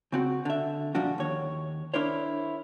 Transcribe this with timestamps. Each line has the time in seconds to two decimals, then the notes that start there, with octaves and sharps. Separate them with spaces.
0.12 C#3 C4 F#4
0.45 D3 E5
0.95 A#2 F3 G3 D4 F#4
1.18 D#2 C#5
1.94 D4 E4 A#4 C5 C#5